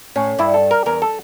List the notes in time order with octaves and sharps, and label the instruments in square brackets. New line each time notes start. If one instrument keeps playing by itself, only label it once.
[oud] A2 [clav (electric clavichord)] C#4
[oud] G2 [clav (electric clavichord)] E4
[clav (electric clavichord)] A4
A#4
[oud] E2 [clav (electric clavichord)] A#4
[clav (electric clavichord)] A4